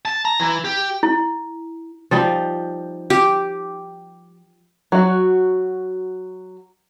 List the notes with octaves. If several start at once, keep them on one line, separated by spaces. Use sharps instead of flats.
A5
A#5
E3
G4
E4
F3 G3 D#4
G4
F#3 F#4